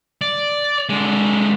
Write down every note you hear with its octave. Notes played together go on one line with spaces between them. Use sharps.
D5
D3 G#3